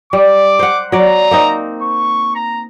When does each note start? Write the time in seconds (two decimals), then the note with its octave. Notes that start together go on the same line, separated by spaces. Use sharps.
0.13 G3 D6
0.59 C5 F#5
0.92 F#3 D5 A#5
1.31 A#3 C4 D#4
1.82 C#6
2.35 A#5